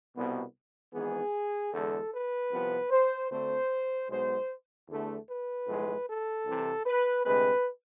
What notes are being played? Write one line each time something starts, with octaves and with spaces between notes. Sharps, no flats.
C2 B2 B3
G#1 G#2 E3 B3 G#4
E2 D3 G#3 A4
B4
C2 C3 F3 B3
C5
D2 D3 A3 C4 C5
B1 B2 G#3 B3 C5
E2 D3 A3
B4
B1 A2 F3 G#3
A4
C2 C3 E3
B4
D2 C3 G#3 C4 B4